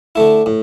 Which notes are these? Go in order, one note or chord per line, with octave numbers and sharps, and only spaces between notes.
D3 A3 E4
A2